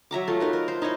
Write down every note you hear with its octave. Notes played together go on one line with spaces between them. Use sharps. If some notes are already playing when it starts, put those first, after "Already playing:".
F#3 E5 A#5 D6
A3 F4
D#4 A#4 B4
A#4
C5
D#4 E4 C#5 D#5